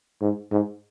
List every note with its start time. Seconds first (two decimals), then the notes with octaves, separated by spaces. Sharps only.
0.21 G#2
0.51 G#2